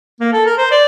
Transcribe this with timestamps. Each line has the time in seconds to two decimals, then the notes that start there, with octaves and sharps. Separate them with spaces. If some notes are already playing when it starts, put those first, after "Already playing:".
0.20 A#3
0.33 A4
0.46 A#4
0.58 C5
0.71 D5